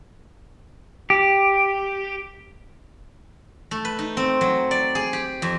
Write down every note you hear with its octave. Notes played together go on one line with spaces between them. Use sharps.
G4
A3
B4
D#4
C4
F#3
D5
G#4
G4
F2